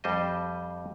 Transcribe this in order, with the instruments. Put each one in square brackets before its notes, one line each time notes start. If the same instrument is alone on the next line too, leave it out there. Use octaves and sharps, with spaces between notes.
[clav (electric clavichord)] F2 G3 C5 D#5